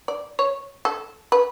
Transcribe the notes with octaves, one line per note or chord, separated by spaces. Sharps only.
D5
C#5
A4
B4